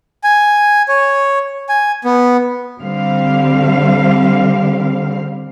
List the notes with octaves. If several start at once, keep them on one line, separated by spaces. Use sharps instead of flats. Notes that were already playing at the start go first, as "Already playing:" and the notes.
G#5
C#5
G#5
B3
D3 G3 C4 F5